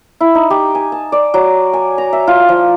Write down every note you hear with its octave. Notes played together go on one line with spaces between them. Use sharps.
E4
D#4
G4
G#5
A5
D5
F#3
G#5
A#5
E5
F4
F3